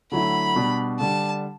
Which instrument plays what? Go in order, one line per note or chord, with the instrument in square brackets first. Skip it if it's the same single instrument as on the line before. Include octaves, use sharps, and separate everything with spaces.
[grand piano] D3 F#3 A3 E4 [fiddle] B5
[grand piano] B2 G3 D4
[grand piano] D3 G3 D4 [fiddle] A5